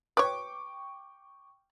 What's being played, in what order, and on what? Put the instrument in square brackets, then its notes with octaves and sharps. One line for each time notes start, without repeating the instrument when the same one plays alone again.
[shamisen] B4 C#5 [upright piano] G5 C#6 D6